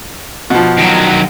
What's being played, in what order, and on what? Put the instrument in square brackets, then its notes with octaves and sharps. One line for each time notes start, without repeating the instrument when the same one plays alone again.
[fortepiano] B2 F3
[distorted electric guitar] D#3 F#3